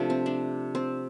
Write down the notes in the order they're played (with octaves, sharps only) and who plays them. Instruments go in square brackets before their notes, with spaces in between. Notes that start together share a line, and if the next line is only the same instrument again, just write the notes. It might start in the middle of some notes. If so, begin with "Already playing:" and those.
Already playing: [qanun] C3 F3 A3 D4
C4
D4
C4